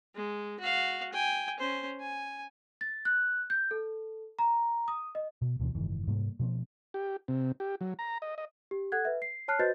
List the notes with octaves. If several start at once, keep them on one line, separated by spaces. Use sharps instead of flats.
G#3
F#4 F5
G5 G#5
C#4 C5
G#5
A6
F#6
G6
A4
A#5
D#6
D#5
B2
D2 B2 E3 C4
F#1 G#2 D#3 E3
G#2 C3 G3 A#3
B2 F3 A#3 C4
G4
C3
G4
F#3
A#5
D#5
D#5
G4
A4 F#5 F#6 G#6
B4 E5
C7
C#5 A5 F6 F#6 C7
F#4 B4 C5 D#5 G6 A6